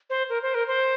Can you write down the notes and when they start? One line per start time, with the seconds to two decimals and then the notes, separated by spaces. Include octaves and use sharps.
0.10 C5
0.29 A#4
0.42 C5
0.54 A#4
0.67 C5